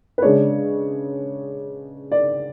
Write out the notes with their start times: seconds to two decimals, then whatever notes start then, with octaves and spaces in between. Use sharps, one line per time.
0.18 B4
0.22 C#3 G#3 D4 C#5
2.12 D5